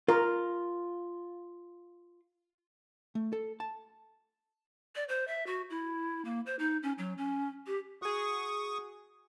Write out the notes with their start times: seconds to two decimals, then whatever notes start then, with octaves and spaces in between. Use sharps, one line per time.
0.08 F4 A#4
3.15 A3
3.33 A4
3.60 A5
4.96 D5
5.09 C5
5.28 E5
5.47 F#4
5.70 E4
6.25 A#3
6.46 C5
6.59 D#4
6.83 C#4
6.98 F#3
7.18 C#4
7.67 G4
8.02 F#4 G#4 C#6 D#6